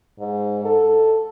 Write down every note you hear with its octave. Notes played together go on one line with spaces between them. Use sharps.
G#2
A4